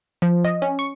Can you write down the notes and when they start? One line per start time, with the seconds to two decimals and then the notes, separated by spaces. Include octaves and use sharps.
0.22 F3
0.45 D#5
0.62 C#4
0.79 C#6